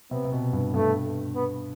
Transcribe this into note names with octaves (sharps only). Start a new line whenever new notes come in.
C3 B3
C3
B2
G2
G2 A3
B3